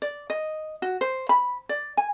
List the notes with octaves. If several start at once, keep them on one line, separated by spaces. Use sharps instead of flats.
D5
D#5
F#4
C5
B5
D5
G#5